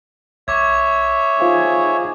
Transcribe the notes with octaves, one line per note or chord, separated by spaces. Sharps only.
B1 C#5 E5 C#6 D6 G#6
D#4 F4 G#4 C5 F5